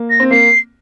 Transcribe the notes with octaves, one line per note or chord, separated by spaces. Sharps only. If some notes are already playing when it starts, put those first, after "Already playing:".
Already playing: A#3
A#6
C4
A#3 C7